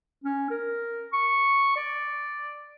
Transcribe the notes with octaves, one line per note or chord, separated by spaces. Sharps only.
C#4
A#4
C#6
D5